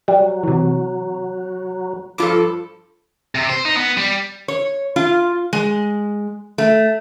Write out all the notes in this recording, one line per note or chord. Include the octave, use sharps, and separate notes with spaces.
F#3 G3
C3 E3
G2 F3 F4 A4 D6
C3
C5
D#4
B3
G3
C#5
F4
G#3
A3